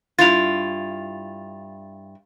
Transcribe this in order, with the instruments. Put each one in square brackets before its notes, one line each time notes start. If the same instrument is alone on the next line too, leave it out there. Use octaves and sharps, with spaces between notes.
[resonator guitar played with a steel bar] G2 E4 F4 [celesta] A6 F7